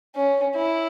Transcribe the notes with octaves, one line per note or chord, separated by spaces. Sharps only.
C#4
E4